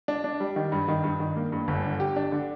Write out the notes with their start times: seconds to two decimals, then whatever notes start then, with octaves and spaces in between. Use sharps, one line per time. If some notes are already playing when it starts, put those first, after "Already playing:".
0.08 D4
0.24 D4
0.40 G3
0.56 D#3
0.72 G2
0.88 D#3
1.04 G2
1.20 D#3
1.36 A#3
1.52 G2
1.68 G1
1.84 D3
2.00 G4
2.16 D4
2.32 D3